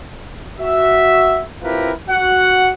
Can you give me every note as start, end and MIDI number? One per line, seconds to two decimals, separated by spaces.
0.59 1.42 66
0.59 1.42 76
1.63 1.91 60
1.63 1.91 64
1.63 1.91 65
1.63 1.91 67
1.63 1.91 70
1.63 1.91 71
2.09 2.71 66
2.09 2.71 78